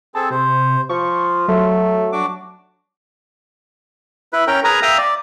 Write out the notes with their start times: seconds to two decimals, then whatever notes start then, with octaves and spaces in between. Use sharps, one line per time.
0.15 C4 G#4 A4 A5
0.30 C3 C5
0.89 F3 F4 C#6
1.48 F#3 A3
2.12 D4 F#4 D6
4.33 E4 B4
4.47 C#4 A#4 G5
4.64 G#4 A#4 B4 G#5 A#5
4.83 E5 F5 G5 A#5 D#6 F6
4.98 D5